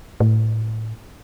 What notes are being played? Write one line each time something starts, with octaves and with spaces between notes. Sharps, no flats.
A2